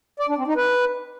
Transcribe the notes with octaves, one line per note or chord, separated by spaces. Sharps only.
D5
D4
C4
D#4
B4